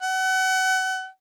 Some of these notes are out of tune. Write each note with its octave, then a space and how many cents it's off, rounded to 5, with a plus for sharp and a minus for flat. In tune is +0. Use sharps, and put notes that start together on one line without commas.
F#5 +30